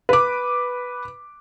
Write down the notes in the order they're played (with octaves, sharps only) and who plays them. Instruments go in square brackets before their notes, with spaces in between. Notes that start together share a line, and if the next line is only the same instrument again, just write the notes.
[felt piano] B4 D6